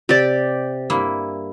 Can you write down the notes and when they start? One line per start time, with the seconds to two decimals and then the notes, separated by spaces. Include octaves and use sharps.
0.09 C3 G4 D5
0.90 G2 A#3 E4